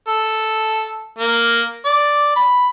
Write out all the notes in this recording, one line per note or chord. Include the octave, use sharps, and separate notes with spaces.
A4
A#3
D5
B5